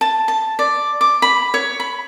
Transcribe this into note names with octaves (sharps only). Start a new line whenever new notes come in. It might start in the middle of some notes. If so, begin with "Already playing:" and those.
A5
A5
D5
D6
B5
C#5
B5